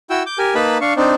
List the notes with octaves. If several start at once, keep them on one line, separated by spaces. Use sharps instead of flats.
E4 F#4 G5 E6
D6 G6
G4 A#4 G#5
A#3 D#4 B4 A5 B5
D4 F5 C#6
C4 D4 D#4